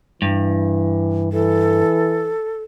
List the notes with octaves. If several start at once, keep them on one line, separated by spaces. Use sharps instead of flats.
G2 E3
E3 A4